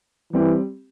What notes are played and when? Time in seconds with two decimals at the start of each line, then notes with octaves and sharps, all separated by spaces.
0.33 E3 G3 C4 G4